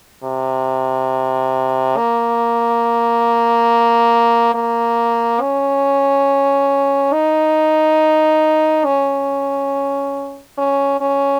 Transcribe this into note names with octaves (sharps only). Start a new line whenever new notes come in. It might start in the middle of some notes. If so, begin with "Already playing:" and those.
C3
A#3
A#3
C#4
D#4
C#4
C#4
C#4